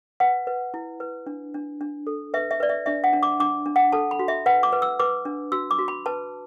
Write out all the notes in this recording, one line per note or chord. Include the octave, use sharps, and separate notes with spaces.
B4 F#5
B4
E4
B4
D4
D4
D4
A4
B4 E5
E5
B4 D5
E5
D4 E5
F#5
D4
D6
D4 D6
D4
F#5
A4 A5
B5
F#4
E5
B4 F#5
D6
B4
E6
B4 D6
D4
F#4 E6
D6
F#4
B5
B4 A5